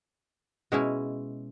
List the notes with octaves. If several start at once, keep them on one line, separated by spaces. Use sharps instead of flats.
B2 G#3 C#4 E4